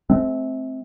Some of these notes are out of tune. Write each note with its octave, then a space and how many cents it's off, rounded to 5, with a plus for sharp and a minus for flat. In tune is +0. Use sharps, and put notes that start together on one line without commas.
A3 -35 C4 +0